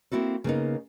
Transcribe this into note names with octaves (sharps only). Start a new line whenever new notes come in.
A#3 C4 E4 F#4 A4
C#3 A#3 B3 D#4